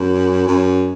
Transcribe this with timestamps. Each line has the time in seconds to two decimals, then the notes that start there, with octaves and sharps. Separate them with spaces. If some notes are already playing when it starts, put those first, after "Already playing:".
Already playing: F#2
0.48 F#2